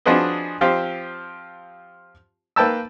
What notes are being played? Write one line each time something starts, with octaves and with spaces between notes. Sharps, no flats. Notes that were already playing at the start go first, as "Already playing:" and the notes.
F3 D4 F#4 G#4 B4 D#5
F3 C4 F4 G4
A#3 B4 G5 A5 E6